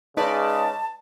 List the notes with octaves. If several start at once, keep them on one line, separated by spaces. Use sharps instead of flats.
C#3 G#3 D#4 B4 D5 A5